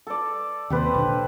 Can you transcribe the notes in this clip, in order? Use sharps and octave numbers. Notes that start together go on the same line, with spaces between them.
A4 D5
D#2 C3 G4 B4 C5
A#1 D3